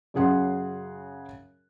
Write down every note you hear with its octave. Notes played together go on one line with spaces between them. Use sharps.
F#2 C#3 G#4 F#5 C6